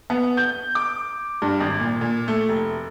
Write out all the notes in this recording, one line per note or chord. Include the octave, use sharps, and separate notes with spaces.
B3
G6
D6
G2
G#1
A#2
A#2
A3
F1